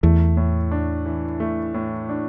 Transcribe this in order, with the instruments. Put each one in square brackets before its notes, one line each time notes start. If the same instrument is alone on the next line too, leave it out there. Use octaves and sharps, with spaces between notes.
[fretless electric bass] E2 [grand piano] A3
[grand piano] A2
D4
E3
A3
A2
D4